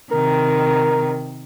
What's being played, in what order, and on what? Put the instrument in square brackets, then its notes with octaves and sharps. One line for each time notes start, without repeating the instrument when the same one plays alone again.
[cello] C3 D#3 [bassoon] A#4